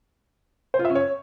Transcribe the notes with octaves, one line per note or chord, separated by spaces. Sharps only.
C5
F4
E5
C#4
C#5